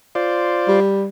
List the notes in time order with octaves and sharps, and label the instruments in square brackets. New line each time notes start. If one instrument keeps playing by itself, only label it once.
[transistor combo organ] F4 C5 D5
[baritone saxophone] G3